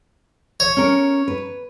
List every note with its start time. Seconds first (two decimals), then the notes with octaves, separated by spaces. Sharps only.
0.60 C#5
0.77 C#4 A#4
1.28 B4